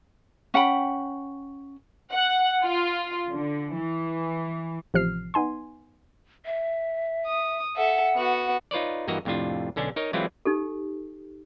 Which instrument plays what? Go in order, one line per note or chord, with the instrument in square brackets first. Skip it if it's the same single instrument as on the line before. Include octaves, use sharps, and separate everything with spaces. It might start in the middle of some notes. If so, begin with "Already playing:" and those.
[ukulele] C#4 F#5 G5 B5
[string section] F#5
F4
D3
E3
[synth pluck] A1 C3 F3 F6 C7
B3 D#4 G#5 C6
[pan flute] E5
[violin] D#6
[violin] A4 E5 [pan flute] F#5
[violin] B3 F#4
[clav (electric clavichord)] D#4 F4 B4 C#5 D5
G2 E3 A#3 F#4 D#5 A#5
F2 A2 C3 D4 F4
B1 D3 C#4 D4
D#4 A#4 C#5 D#5
E3 F#3 G#3 C4 E4 F4
[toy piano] D#4 G4 A4